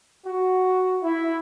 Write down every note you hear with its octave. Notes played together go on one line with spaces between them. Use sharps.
F#4
E4